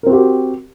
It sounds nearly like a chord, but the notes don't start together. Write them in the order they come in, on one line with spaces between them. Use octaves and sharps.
A#4 C4 F#4 G4